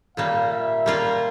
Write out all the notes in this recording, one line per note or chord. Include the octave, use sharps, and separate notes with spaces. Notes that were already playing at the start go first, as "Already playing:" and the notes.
A#2 G3 A#3 F5
E5
G3 A#3 F4